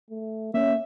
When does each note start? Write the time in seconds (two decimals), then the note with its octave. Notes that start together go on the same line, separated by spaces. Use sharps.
0.10 A3
0.54 A#3 C#4 E5